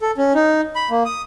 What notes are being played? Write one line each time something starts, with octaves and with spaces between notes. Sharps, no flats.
A4
C#4
D#4
B5
A#3
D#6